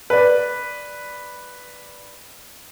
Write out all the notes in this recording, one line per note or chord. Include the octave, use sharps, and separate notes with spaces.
B4 D5